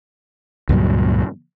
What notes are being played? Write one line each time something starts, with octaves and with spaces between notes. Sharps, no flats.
C#2 G2 A#2 F#3